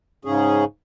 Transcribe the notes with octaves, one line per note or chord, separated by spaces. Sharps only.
G#2 C#3 C#4 G#4